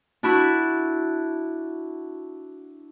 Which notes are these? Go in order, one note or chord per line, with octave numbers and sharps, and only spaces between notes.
D4 E4 F#4